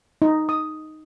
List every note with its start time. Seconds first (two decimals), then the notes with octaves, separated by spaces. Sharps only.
0.22 D#4
0.49 D#6